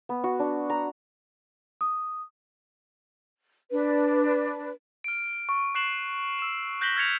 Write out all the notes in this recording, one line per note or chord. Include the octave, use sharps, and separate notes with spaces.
B3
F#4
D4
A#5
D#6
D4 B4
F6 D7
C#6
C#6 F#6 C7 E7 F#7
E6 E7
F#6 G6 A#6 B6 F#7 G7
F6 G#6 B6 C#7 F7